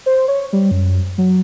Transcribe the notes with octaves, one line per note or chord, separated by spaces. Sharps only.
C5
C#5
G3
F#2
F#3